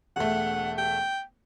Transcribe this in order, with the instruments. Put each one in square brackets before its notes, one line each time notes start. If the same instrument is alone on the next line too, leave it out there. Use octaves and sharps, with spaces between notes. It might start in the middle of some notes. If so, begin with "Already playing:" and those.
[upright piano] E1 A3 [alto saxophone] F#5
[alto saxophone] G5